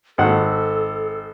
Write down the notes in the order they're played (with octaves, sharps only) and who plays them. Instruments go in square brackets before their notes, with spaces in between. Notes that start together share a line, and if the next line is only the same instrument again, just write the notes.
[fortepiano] G#1 F#5 [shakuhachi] A4